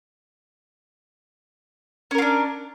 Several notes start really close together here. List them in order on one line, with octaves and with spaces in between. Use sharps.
C#4 A#4 F4 D4